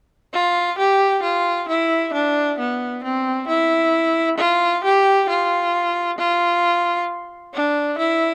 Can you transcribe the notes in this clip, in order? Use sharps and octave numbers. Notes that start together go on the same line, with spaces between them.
F4
G4
F4
E4
D4
B3
C4
E4
F4
G4
F4
F4
D4
E4